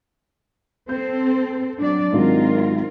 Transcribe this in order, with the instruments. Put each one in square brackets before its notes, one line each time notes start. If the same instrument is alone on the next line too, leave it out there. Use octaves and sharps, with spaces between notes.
[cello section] C4 A4 C5 [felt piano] G6
[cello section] F#3 D4 D5
[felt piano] G#2 D#3 F#3 [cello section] C4 F4 A#4